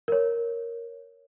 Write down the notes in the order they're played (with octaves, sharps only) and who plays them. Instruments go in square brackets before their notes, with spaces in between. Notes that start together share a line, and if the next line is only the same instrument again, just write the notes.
[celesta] A#4 C#5